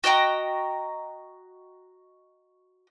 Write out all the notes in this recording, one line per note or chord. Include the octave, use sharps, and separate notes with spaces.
F#4 D#5 G5 A#5